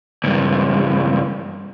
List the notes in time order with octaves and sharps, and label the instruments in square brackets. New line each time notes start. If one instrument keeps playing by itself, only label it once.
[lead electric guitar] C#2 G2